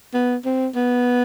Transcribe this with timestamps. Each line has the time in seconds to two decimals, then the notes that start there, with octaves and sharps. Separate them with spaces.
0.14 B3
0.45 C4
0.76 B3